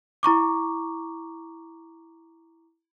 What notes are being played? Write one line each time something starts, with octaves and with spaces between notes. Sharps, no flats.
E4 A#5 C#6 D6